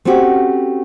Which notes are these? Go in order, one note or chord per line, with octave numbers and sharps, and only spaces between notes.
A3 C4 C#4 F#4 G4